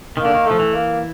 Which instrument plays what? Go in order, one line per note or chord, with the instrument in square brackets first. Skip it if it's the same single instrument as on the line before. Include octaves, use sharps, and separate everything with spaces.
[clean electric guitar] D#3 [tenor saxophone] A#3
[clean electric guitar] D3
D#3
[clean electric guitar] F3 [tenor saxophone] A3
[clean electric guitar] E3
[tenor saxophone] A#3